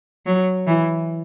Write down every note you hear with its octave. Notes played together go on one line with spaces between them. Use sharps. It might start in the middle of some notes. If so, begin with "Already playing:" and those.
F#3
E3